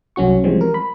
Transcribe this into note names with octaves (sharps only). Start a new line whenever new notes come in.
C2 F#3 C#4 F#4 C#6
E3 F3 G3 G#3 C4
A#4
B5